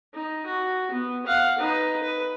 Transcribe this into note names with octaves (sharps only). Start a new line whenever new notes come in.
D#4
F#4
B3
F5 F#5
D#4 B4
B4